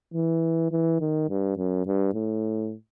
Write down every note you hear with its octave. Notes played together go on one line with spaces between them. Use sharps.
E3
E3
D#3
G2
F#2
G2
A2